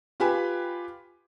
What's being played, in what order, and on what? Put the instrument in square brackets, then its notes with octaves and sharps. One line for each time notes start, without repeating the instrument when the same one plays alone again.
[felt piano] F4 G4 B4 G#5 B5